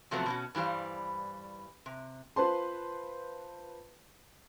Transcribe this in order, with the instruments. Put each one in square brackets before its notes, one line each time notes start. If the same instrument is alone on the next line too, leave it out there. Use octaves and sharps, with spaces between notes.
[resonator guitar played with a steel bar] C3 F3 F#3 A3 B3 C4
B2 C#4 F#4
G2 E3 G3 C5 F5
C3
[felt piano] F4 B4 C5 A5 C6